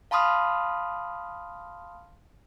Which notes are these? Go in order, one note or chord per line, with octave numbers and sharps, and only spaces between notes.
F5 A5 B5 C6 D#6 F6